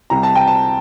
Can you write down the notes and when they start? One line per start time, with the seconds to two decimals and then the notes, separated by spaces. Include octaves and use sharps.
0.10 C2 C3 G3 A#5
0.23 A5
0.35 G5
0.47 A5